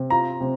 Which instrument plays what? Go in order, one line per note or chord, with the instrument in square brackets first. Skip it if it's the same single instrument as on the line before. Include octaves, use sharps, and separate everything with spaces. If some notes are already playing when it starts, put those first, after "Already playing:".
Already playing: [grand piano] C3
[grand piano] F4 [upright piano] A#5
[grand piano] C3